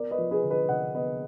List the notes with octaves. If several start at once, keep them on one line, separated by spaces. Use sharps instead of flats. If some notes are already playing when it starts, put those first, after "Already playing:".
Already playing: B3 A#4 D5
B4 D#5
F3
G#4 B4
D3
B4 D#5
D3 D#5 F#5
B3 B4 D#5